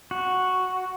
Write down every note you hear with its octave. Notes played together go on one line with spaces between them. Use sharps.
F#4